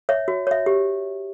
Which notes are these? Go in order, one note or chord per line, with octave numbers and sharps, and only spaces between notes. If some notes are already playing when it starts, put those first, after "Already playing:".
C#5 E5
F#4
C#5 E5
G4